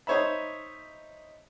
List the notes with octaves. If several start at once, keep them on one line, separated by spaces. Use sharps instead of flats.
D#4 C5 C#5 E5 B5